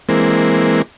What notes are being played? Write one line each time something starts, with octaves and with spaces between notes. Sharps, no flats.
E3 G#3 A#3 C4